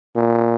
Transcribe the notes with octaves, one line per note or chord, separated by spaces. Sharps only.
A#2